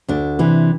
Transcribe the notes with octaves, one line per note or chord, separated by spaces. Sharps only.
D2 D4
C3 E3